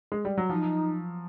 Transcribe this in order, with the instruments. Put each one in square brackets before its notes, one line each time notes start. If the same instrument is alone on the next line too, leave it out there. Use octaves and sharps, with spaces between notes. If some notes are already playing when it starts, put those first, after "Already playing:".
[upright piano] G#3
G3
F#3
[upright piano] F3 [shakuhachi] D#4